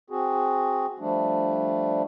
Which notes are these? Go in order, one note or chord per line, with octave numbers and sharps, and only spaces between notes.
C4 F#4 G#4
F3 G3 A3 D4